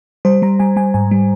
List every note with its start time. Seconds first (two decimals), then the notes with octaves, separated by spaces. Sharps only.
0.25 G3 C5
0.42 G3 A#5
0.60 G3 G#5
0.76 G3 G#5
0.94 G#2 G#5
1.11 G3